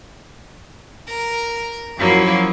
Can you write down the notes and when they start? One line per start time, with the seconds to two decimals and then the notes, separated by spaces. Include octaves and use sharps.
1.06 A#4
1.98 F#2 F3 F#3 A#3 E4